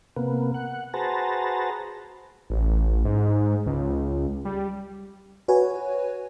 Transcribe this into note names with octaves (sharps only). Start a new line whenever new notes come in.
C3 A#3 B3
F#5
F#4 G#4 B4 C5 A5 A#5
A1
G#2
C#2
G3
F#4 B4 C#5 G#5